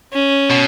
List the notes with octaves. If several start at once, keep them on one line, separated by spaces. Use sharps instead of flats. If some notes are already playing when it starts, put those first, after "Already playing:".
C#4
B2